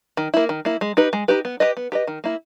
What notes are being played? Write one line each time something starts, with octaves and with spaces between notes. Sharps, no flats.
D#3
A#3 E4
D#3
A#3 E4
G#3
D#4 G4 B4
G#3
D#4 G4 B4
B3
G4 B4 D#5
B3
G4 B4 D#5
D#3
A#3 E4